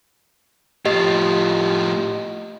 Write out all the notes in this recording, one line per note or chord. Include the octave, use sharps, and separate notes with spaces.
A2 F3 G4 D#5